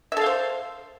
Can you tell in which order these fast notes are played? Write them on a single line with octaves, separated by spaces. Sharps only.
E5 A4 F5 C5